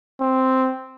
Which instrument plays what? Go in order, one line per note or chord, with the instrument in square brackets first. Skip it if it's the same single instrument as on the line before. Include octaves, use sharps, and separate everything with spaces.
[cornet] C4